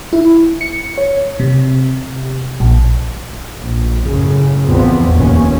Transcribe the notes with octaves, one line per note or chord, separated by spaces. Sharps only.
E4
C#7
C#5
C3
A#1
A#1
F#2 A2 C#3
A1 E2 F3 B3 C4
F1 D#2 A#2 C#4